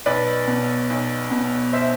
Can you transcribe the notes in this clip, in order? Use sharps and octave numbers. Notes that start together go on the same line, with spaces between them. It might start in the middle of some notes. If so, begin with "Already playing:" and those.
B1 B4 D5
B2
B1
B2
C5 E5